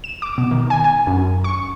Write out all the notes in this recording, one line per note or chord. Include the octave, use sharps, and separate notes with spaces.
E7
D6
B2
D#3
G#5
G#5
F#2
C#6